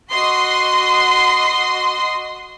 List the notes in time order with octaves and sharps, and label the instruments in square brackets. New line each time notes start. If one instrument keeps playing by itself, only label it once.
[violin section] F#4 D#5 C6